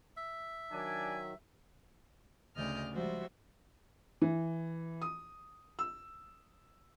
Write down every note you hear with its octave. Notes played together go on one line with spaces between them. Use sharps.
E5
D#3 F#3 D4 D5 G#5
D2 C#3 D5 D#5 F6 G6
F3 G3 G#3 F#4 C5 E5
E3
D#6
E6